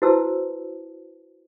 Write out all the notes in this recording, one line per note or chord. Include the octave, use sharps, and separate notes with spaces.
E4 F#4 B4 C5 A5 E6